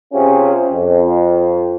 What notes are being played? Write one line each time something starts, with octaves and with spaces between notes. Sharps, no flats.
C3 C#4 F4 G4 G#4
F2